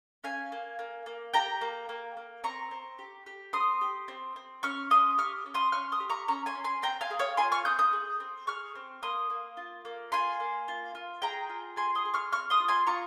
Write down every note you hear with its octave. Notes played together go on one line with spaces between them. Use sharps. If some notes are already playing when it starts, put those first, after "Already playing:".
C#4 F5 G#5
A#3
A#3
A#3
G4 G5 A#5
A#3
A#3
A#3
C4 A#5 C#6
C4
G4
G4
C4 C6 D#6
G4
C4
C4
C#4 C#6 F6
C#4 C6 D#6
G4 C#6 F6
C#4
C6 D#6
C#4 C#6 F6
C6 D#6
G4
A#5 C#6
C#4 A#5 C#6
G#5 C6
C#4
G#5 C6
C4 G5 A#5
F5 G#5
G#4
C#5 F5
F4 G#5 C6
C#6 F6
C4 D#6 G6
D#6 G6
G#4
C4
G#4 C#6 F6
C4
A#3 C6 D#6
A#3
F4
A#3
F4 G#5 C6
A#3
F4
F4
G#4 G5 A#5
F4
G#4 G#5 C6
C6 D#6
G#4
C#6 F6
C4 C#6 F6
C6 D#6
F4
G#5 C6
F4 A#5 C#6